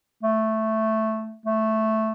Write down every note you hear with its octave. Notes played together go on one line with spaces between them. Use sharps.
A3
A3